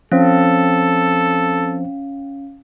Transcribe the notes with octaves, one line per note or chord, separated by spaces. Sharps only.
F3 C4 C#4 A4 C5 F5